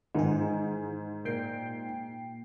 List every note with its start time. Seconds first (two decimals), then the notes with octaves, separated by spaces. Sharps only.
0.15 G#2 D#3 E3 G#4
1.25 A#2 G5 C7